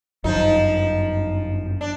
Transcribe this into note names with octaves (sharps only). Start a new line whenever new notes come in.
G1 F#2 F3 F#3 D#4
D4